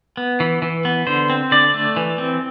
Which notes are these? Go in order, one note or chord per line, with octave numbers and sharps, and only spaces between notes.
B3
E3
E3
B3
D3 C5
C4
D3 D5
A3
E3
C4